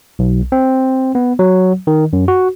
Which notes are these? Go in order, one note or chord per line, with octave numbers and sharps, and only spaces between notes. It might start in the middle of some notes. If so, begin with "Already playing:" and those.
B1
C4
B3
F#3
D#3
F#2
F#4